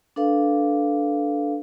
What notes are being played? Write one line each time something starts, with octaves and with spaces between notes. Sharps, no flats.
D4 A4 B4 F5